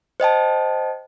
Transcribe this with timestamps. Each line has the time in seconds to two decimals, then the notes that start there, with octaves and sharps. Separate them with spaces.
0.20 C5 D#5 G5 A5